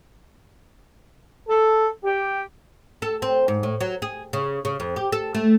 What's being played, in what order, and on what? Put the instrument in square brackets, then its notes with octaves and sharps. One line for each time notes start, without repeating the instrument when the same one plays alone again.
[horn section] A4
G4
[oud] A4
C4
G#2
A2
F#3
G#4
C#3
C#3
F2
G4
A4
A3